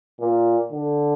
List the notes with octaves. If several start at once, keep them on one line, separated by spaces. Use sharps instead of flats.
A#2
D3